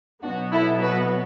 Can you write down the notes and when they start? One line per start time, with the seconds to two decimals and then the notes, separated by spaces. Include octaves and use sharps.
0.23 B2 F#3 B3 D4 F#4
0.53 E4 A4
0.81 F#4 B4